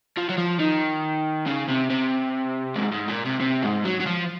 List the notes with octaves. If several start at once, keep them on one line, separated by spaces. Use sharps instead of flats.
F3
F#3
F3
D#3
C#3
C3
C3
G#2
G#2
A#2
C3
C3
G#2
F#3
F#3
F3